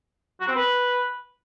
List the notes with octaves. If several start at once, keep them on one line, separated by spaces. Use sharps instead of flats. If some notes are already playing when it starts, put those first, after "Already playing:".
F#4
C4
B4